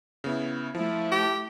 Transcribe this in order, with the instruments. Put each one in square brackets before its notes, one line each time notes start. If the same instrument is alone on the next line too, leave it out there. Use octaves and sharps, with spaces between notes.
[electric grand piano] C#3 B3 E4
[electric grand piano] F3 [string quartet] A3 E4
[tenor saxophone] G4